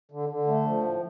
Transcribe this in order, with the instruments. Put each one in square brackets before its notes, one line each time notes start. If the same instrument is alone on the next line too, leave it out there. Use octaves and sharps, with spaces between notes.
[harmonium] D3
D3
A3
F3
A2